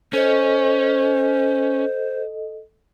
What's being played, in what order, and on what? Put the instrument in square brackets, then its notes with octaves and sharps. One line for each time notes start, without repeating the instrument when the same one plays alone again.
[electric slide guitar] C#4 [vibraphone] A4 D#5 [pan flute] C5